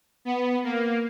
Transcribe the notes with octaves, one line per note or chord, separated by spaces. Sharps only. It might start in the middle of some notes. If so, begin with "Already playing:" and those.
B3
A#3